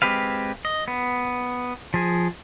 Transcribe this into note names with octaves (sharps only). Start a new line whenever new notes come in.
G#3 C4 G4 B4 F5
D#5
B3
F3 G#4